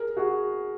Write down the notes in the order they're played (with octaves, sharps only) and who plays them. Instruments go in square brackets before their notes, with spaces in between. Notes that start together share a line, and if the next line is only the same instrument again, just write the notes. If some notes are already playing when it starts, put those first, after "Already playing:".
Already playing: [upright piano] G#4 A#4
F#4 G#4